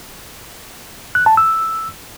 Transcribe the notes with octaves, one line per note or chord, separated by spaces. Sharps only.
F#6
A5
E6